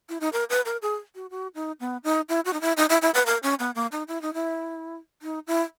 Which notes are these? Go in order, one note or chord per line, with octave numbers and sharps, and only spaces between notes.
E4
D#4
A#4
B4
A#4
G#4
F#4
F#4
D#4
B3
D#4
E4
F#4
D#4
E4
D#4
E4
E4
B4
A#4
C#4
B3
A#3
D#4
E4
D#4
E4
D#4
E4